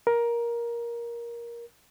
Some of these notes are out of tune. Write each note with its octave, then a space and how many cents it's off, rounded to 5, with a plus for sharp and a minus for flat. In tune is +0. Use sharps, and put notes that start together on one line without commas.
A#4 +15